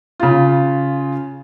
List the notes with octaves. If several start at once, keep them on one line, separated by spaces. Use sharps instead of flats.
C#3 F4